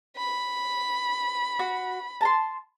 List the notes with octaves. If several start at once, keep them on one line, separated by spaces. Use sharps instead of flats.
B5
F#4
A5 A#5 C6